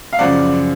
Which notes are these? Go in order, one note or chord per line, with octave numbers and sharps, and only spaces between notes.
F5
F#2 C#3 F3 D5 F#5